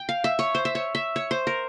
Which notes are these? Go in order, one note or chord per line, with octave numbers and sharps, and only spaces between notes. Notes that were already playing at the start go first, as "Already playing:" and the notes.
Already playing: G5
F5
E5
C#5
C5
E5
C#5
E5
C#5
C5
A#4